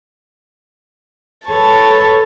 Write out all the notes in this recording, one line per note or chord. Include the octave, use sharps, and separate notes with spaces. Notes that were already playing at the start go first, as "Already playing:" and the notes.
A4 B4 C#5 A5